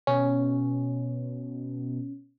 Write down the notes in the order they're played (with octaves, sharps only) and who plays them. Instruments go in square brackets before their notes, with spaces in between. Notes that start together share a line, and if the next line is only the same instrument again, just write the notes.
[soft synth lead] B2 [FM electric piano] C#4